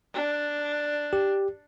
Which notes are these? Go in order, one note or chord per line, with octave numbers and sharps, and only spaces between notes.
D4
G4